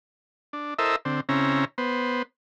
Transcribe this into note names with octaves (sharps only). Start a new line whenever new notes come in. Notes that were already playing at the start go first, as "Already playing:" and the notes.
D4
E4 A4 A#4 C5 D#5 E5
D3 C4
C#3 C4 C#4 E4 A#5
B3 C5